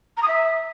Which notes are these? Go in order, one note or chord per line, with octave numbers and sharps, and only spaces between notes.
A#5
D#6
E5